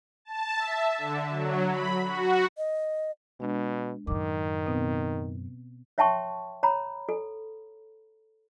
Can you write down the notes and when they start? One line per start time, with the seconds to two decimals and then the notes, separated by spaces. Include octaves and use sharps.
0.25 A5
0.56 E5
0.98 D3
1.30 F#3
1.68 B5
2.04 F#4
2.58 D#5
3.40 B2 G#3 D4
4.07 F#2 A2 D#3 D6
4.66 B2 B3 C4
5.98 C#5 E5 G5 A5 C6 C#6
6.63 C#5 A#5 B5
7.09 A4